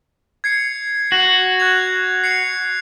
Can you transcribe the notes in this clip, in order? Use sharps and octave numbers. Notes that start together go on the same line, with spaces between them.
G#6 C7 C#7
F#4
F#6 G#6 F7
C7 C#7 F7